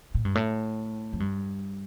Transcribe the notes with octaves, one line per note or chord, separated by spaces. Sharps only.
A2
G2
A2
F2
G2